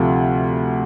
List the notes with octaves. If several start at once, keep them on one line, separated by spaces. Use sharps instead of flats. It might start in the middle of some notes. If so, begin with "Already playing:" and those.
Already playing: D2 C3 F3 A3